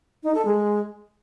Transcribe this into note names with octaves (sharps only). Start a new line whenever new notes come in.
D#4
A4
G#3